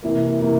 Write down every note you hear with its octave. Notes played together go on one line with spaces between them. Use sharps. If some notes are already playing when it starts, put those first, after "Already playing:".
C3 E3 A#3
C3 E3 A#3